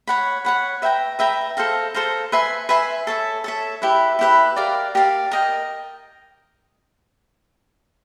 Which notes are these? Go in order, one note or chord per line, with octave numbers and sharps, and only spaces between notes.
C#5 F#5 B5
C#5 F#5 B5
B4 E5 G5 A#5
B4 E5 G5 A#5
A4 C5 F5 A#5
A4 C5 F5 A#5
B4 E5 G#5 C6
B4 E5 G#5 C6
A4 C#5 E5
A4 C#5 E5
E4 G4 B4 E5
E4 G4 B4 E5
G4 A#4 D5 F5
G4 A#4 D5 F5
A#4 D#5 G5